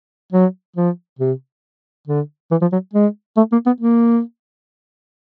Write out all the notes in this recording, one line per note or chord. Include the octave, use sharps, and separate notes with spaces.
F#3
F3
C3
D3
E3
F3
F#3
G#3
A3
A#3
B3
A#3